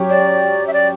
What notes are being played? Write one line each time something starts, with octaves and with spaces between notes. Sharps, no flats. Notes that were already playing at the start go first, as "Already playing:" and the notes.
Already playing: F#3 C#4 G4 C#5
D5
E5
D5